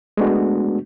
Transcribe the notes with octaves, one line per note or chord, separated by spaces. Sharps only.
G#3 A3 B3 D4 F#4